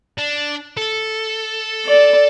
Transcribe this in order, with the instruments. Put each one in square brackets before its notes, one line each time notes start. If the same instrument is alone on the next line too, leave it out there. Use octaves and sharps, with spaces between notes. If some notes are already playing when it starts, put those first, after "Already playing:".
[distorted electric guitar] D4
A4
[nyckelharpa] D5